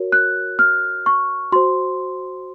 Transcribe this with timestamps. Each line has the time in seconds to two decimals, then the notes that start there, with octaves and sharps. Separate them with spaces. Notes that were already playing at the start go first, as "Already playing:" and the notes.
Already playing: F#4 A#4 C#5
0.12 F#6
0.59 F6
1.06 C#6
1.52 F#4 C5 C6